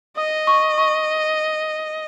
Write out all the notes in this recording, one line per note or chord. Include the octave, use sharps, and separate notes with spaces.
D#5 D#6
C#6
C#6